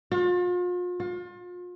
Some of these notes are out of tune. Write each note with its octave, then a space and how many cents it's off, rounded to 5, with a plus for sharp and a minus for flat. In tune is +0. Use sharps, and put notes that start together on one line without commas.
F4 +40
F4 +35